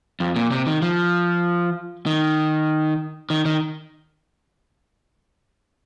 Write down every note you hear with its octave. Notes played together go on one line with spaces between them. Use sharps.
F2
A#2
C3
D#3
F3
D#3
D#3
D#3